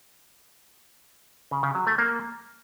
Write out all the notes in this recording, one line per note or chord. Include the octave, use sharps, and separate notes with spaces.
C#3
C#3
F#3
A3
A#3